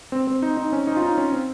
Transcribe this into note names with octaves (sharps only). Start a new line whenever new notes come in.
C4
C4
D#4
D#4
C#4
D#4
F4
D#4
C#4
C4